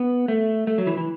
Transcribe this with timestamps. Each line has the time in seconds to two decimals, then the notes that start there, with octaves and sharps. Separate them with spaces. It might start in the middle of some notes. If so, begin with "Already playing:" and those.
Already playing: B3
0.28 A3
0.67 A3
0.78 F#3
0.87 E3
0.97 E3